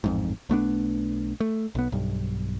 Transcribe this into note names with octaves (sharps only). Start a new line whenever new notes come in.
A1 F2 G#2
B1 A3 B3 D4
A3
B1 B3
B1 G2